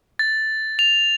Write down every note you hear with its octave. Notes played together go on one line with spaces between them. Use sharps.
A6
F7